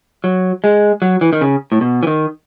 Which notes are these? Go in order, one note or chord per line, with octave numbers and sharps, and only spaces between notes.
F#3
G#3
F#3
E3
D#3
C#3
A2
B2
E3
D#3